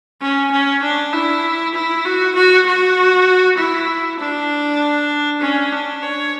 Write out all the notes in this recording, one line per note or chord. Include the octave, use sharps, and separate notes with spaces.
C#4
C#4
D4
E4
E4
F#4
F#4
F#4
E4
D4
C#4
D4
C#5